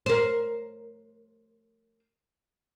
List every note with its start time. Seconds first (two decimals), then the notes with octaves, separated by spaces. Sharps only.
0.06 A#4 C5